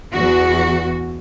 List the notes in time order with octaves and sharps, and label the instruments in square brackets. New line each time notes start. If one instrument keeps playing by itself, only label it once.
[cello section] E2 F#4